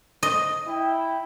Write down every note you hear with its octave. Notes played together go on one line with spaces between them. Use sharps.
D#5
E4 G5